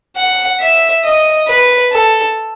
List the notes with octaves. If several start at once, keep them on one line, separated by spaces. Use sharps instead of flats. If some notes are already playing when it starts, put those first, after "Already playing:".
F#5
E5
D#5
B4
A4